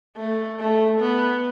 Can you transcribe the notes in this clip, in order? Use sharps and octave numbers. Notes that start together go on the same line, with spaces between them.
A3
A3
B3